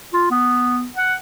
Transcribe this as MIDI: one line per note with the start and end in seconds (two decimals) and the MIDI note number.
0.13 0.26 65
0.30 0.86 59
0.96 1.15 78